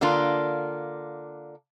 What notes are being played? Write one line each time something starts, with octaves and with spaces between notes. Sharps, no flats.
D3 A#3 D4 F4